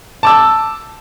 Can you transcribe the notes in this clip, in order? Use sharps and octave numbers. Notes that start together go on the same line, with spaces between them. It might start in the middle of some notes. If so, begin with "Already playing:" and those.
A5 D6 E6